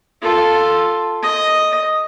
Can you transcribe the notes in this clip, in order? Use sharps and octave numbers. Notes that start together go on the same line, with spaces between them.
F4 A4
D#5